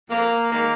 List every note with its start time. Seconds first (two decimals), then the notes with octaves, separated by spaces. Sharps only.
0.10 F2 A#3
0.51 D#3 G#3 A#3